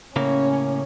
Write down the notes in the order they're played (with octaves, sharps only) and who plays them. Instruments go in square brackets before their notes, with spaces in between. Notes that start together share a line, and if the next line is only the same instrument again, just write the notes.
[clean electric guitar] A2 C#3 A#3 [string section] C#4